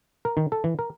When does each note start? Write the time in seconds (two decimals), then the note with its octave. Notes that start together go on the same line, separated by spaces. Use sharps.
0.25 A#4
0.37 D#3
0.52 A4
0.64 E3
0.79 A#4